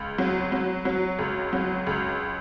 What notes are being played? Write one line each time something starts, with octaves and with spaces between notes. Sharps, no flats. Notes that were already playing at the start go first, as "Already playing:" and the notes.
Already playing: C#2
F#3
F#3
F#3
C#2
F#3
C#2